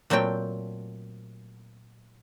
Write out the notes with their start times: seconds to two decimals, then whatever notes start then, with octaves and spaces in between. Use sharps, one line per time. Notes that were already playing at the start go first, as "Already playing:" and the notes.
0.10 A#2 F#3 A3 C4 G5